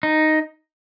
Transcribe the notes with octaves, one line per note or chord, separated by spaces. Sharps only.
D#4